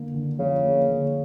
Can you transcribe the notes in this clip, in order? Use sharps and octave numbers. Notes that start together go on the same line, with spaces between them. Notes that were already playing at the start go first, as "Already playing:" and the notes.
Already playing: D3 A#3
D3
C#3 F3
A#3
D3